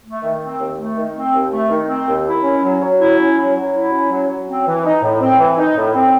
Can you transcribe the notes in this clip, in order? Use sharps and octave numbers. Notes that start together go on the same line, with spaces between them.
A3
D#3
C4
D#2
A3
D#3
C4
D#2
A3
D#3
C4
D#2
E4
C#4
F#3
F#3
E4
C#4
F#3
F#3
E4
C#4
F#3
F#3
C4
E3
D#4
A2
C4
E3
D#4
A2
C4